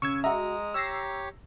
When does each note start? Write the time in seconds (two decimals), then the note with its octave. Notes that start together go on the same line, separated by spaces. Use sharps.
0.02 C#3 C#6 E6 G#6
0.24 G#3 F#4 E5 A#5 D#6
0.74 G4 C#5 E6 A#6 C7